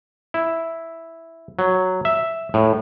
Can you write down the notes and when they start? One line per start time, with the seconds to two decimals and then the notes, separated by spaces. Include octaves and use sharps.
0.34 E4
1.59 F#3
2.05 E5
2.54 A2